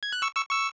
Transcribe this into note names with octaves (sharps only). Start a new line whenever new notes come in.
G#6
F#6
C#6 E6
C#6 E6
C#6 E6